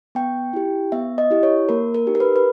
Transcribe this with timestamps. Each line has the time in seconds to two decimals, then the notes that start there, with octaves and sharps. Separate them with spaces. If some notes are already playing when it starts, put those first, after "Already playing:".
0.15 B3 G5
0.53 E4 G4
0.92 B3 E5
1.18 D#5
1.31 E4 G4
1.43 C#5
1.69 A#3 A#4
1.95 A#4
2.07 D#4 G4
2.15 A#4
2.20 B4
2.36 B4